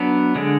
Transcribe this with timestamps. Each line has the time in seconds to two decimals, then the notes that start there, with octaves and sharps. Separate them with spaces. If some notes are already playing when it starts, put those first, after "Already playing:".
Already playing: F#3 B3 D4
0.35 D3 G#3 D4